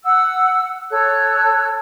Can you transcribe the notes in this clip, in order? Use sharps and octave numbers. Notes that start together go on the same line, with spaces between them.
F#5 E6
A4 C#5 E6 F#6